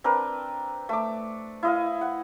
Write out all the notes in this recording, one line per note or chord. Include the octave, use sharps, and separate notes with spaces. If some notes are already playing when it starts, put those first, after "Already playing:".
C4 D4 A#4 B4
A3 D6
E4 D#5 F5
F#5